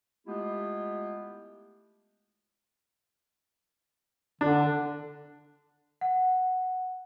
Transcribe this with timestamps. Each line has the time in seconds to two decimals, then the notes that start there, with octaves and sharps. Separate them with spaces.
0.27 G#3 A3 B3 E4 F4 G4
4.41 D3 D4
6.01 F#5